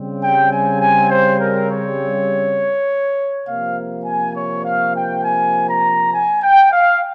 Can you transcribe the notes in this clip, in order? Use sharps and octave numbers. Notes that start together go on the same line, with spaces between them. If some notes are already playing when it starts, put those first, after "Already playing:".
Already playing: C#3 G3 C4
G5
G#5
G#5
C5
A#4
C#5
C3 F3 A#3 F5
G#5
C#5
F5
G5
G#5
A#5
G#5
G5
F5